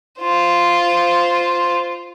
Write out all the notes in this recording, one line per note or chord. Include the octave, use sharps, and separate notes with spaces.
F4 C5